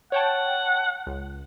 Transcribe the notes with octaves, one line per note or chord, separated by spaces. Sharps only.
C#5 F#5 G5 A5
C#2